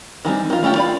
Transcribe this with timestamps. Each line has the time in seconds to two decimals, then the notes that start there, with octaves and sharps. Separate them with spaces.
0.25 D#3 E3 G3 C4
0.50 D#3 F4
0.63 A3 C#4 F4 G4 G5
0.76 F4 D5 B5